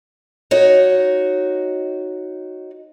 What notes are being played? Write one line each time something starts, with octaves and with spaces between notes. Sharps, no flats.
D#4 F#4 C#5